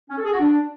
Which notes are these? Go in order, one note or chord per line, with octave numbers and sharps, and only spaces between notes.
C#4
A4
G#4
F#4
D4